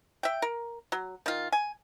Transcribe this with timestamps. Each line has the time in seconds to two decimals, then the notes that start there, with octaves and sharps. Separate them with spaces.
0.23 E5 G5
0.42 A#4
0.92 F#3
1.26 D#3 F4
1.52 G#5